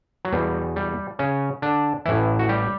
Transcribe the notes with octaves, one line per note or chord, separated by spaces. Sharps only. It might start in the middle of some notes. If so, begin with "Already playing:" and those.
F#3
E2 B2 G3
G3
C#3 C#4
D3 D4
A1 A2 E3 E4
F#4
G3 G4